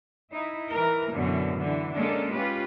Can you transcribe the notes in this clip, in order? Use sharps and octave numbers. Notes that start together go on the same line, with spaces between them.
D#4 E4
E3 A#4
F#2 B2 D3 E3
D3 E3
G#3 A#3 C#4 D4 A4
C#4 F4 G4 B4